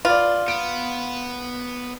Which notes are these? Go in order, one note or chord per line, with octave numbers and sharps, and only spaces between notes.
F4 B4 D5
B3 D7